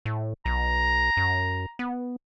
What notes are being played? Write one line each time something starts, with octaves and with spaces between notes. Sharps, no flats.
A2
B1 A#5
F#2
B3